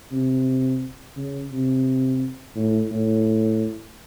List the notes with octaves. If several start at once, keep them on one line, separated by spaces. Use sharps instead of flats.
C3
C#3
C3
A2
A2